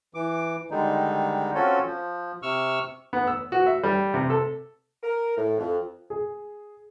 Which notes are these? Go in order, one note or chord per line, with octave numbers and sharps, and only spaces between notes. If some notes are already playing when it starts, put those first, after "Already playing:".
E3 D6
D3 D#3 G3 G#3 D#4
C4 C#4 F4 F#4 A4 C#5
F3
C3 C#6 E6 F6
B3
E6
F#4
E5
G3
C3
A4
A#4
A2
F2
G#4